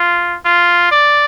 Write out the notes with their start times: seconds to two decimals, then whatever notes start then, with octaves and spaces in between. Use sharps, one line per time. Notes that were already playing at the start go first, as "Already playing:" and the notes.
Already playing: F4
0.45 F4
0.92 D5